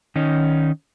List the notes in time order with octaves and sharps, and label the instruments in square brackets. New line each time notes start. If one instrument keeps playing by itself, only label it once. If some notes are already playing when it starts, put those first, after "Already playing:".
[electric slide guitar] D#3 C#4 D#4